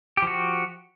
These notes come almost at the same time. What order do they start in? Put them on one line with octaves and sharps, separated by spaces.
G4 F3 F#4